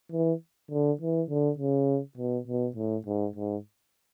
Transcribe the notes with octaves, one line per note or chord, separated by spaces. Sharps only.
E3
D3
E3
D3
C#3
B2
B2
A2
G#2
G#2